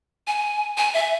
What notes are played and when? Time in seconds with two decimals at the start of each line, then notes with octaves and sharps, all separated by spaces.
0.27 G#5
0.78 G#5
0.94 E5